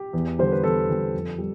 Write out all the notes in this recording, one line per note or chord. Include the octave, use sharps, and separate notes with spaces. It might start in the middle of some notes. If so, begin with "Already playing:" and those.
Already playing: G4
E2
D3 G3 C5
B4
E2 A4
D3 G3
F2
G3